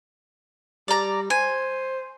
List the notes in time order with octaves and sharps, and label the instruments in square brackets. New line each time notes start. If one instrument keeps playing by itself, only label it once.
[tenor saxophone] G3 [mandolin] D5 A#5
[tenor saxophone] C5 [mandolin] G#5